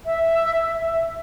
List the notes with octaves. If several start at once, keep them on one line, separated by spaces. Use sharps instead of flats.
E5